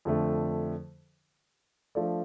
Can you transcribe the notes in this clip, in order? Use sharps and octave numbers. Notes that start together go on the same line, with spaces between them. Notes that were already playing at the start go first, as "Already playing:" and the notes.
F2 D3 A3
F3 A3 D4 A4 D5